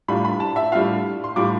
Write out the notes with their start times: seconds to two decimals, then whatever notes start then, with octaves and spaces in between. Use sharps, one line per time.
0.08 A2 G3 D4 F4 B5
0.25 B5
0.40 A5
0.56 E5
0.72 A2 G3 D4 F4 F5
1.24 C6
1.36 A2 G3 D4 F4 D6